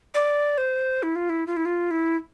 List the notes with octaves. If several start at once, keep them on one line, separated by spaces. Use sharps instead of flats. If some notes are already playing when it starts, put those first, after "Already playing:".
D5
C5
E4
F4
E4
F4
E4
F4
E4